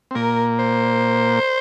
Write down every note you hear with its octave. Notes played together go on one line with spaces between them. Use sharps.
C4
A#2 A#3 A#4
C5